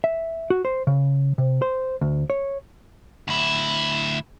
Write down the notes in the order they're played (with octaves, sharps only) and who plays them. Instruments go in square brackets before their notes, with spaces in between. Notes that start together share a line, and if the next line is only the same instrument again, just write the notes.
[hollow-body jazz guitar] E5
F#4
C5
C#3
C3
C5
D2
C#5
[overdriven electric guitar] D2 E4